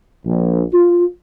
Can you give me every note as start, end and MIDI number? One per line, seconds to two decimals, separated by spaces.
0.25 0.62 34
0.73 1.04 65